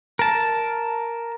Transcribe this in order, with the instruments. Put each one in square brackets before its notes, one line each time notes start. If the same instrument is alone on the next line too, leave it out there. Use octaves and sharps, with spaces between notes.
[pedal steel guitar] A#4 A5